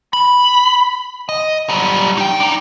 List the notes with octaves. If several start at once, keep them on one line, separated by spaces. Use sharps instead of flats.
B5
D#5
F#3 G3
D#4 G5
D4 D#4